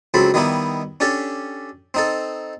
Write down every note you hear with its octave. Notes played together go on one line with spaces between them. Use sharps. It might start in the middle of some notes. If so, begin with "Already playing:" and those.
C#2 F#3 C4 A4 B5
D#3 G3 B3 D#4 E4
C#4 D4 G4 A4
C4 D#4 A4